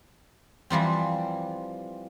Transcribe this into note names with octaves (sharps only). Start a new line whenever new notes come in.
E3 F3 G3 C4